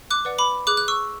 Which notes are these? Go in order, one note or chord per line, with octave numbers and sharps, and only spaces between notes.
D6 F#6
B4 D5 F#5
B5 D6
G#4 D6 F#6
F#6
C#6 E6